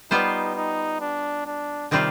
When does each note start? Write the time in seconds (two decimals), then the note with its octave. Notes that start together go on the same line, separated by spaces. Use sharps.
0.11 G3 B3 D#4 F4 C5
0.56 D#4
1.01 D4
1.46 D4
1.91 C3 D#3 G3 C4 F4